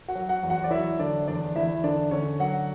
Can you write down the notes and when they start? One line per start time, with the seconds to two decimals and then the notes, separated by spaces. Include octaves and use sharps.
0.08 F#4 F#5
0.15 F#3
0.29 F#4 F#5
0.43 E2
0.50 F#4 F#5
0.64 D5
0.71 F#3 E4 E5
0.99 D3 D4 D5
1.27 E2 D4 D5
1.56 E2 E4 E5
1.84 D3 D4 D5
2.11 D3 C#4 C#5
2.40 F#3 F#4 F#5